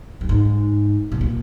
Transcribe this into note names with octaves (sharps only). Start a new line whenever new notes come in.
G2
G#2
B2
A#2